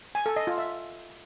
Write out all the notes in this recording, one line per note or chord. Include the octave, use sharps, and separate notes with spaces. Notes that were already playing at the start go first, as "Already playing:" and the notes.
G#5
A4
D#5
F4
E5